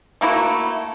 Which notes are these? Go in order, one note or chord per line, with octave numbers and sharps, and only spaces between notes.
A3 A#3 E4 F#4